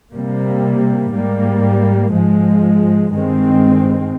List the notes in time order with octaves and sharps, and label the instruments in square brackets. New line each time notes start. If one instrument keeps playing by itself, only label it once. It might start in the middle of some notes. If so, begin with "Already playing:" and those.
[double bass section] C3 G3 A#3
G#2 G3 A#3
G#2 F3 G#3
G2 D#3 G#3 C4